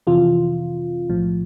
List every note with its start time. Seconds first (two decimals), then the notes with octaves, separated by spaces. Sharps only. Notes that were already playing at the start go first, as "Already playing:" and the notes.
0.07 F2 C3 E3 F4
1.09 B1 A2 F3